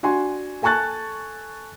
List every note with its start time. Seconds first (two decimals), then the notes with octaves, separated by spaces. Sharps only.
0.03 D4 F#4 G#5 C6
0.62 A4 G#5 A5 C#6 F#6 A6